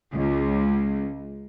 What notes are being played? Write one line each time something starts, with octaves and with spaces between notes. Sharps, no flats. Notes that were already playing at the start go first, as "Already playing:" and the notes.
C#2